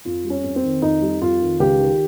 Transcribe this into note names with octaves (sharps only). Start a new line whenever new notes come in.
F2 F4
G3
C#4
F2
C4
D#3
F2 D#4
G3
F2 F4
D#3
C#2 G4
D#3